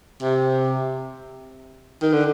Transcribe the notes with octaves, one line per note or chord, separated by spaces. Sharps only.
C3
D#3
D3